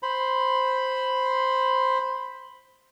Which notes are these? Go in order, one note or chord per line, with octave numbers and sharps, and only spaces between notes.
C5 B5